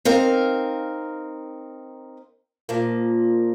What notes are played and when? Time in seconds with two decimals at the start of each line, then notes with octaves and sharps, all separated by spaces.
0.05 C4 D#4 A#4 F5
2.69 A#2 F3 A#3